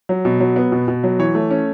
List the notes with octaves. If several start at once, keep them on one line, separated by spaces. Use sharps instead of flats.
F#3
B2
F#3
B3
B2
B2
F#3
E3 C#5
A3
C#4